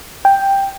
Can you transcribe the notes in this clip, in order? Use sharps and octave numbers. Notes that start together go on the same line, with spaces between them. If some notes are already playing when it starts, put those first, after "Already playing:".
G5